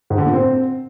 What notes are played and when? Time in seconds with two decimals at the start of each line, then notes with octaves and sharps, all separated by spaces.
0.10 G#2
0.18 D3
0.26 A#2
0.33 C4